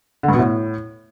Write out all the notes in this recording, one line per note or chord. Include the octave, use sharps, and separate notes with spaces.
D3
G2
B2
A2